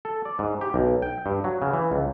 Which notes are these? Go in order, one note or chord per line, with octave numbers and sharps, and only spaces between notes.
A4
D5
G#2
G4
B1
G5
G2
F#3
C#3
E3
C#2